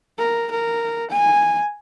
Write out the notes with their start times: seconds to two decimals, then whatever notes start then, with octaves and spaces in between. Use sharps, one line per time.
0.19 A#4
0.51 A#4
1.11 G#5